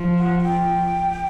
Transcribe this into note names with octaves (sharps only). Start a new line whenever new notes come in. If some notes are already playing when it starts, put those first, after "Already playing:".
Already playing: F3
F#5
F#5
G5